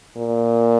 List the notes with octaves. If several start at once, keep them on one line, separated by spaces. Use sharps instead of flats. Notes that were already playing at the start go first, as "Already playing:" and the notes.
A#2